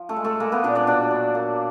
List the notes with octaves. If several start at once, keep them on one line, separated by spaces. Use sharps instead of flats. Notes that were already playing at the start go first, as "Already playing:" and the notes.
Already playing: F3
A3 A4
G#3
A3 A4
G#3 A#3 A#4
B3 B4
A#2 D4 D5
D4 D5
B2 D4 D5
F#3
A#3